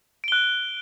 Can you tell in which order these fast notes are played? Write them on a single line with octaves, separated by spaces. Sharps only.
D7 G7 F#6